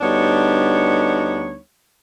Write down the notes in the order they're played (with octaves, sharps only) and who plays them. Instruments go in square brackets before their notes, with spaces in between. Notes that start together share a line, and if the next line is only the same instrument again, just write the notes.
[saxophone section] D2 G3 B3 D4 D#4 C#5